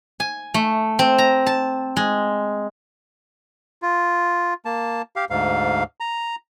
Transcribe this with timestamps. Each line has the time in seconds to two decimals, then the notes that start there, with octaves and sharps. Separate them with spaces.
0.20 G#5
0.54 A3
0.99 C4
1.18 A#5
1.46 A5
1.97 G#3
3.82 F4
4.65 A#3 A5
5.16 G4 F5
5.30 D2 G#2 F5
6.00 A#5